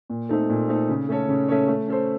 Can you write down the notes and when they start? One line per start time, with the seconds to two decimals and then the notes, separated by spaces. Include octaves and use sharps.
0.10 A#2
0.29 A3 C4 D#4 A4
0.49 A#2
0.69 A3 C4 D#4 A4
0.89 C#3
1.09 A3 C#4 A4 C#5
1.28 C#3
1.49 A3 C#4 A4 C#5
1.68 A3
1.88 C#4 A4 C5